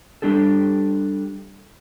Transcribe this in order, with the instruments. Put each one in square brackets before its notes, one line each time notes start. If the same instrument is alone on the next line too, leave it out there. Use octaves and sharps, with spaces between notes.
[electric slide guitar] G3 D4 G4 A4